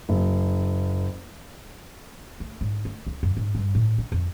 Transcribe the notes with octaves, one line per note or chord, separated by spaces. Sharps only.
F#1
A3
G#2
A3
C#2
F#2
G#2
G2
A2
D4
F2